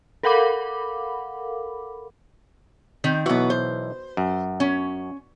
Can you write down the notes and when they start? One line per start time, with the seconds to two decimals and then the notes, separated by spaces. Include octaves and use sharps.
0.23 A4 A#4 F5 F#5 B5 D6
3.04 D#3 C4
3.26 B1 E3 B3 F#4
3.50 C5
4.17 F#2
4.60 C#4